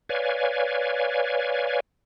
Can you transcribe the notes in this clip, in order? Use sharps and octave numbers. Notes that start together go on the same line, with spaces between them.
B4 C#5 D5 F5 G#5